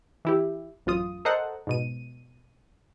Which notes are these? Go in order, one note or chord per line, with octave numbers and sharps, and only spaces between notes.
E3 E4 G4
A1 F#2 F4 D#6
A4 A#4 C5 D#5 F#5
G#2 B2 D#7